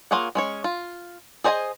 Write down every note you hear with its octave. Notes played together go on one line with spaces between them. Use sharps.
A#3 F4 G#4 C#5 F#5
G#3 C#4 C#5
F4
G#4 C5 D#5 E5 G#5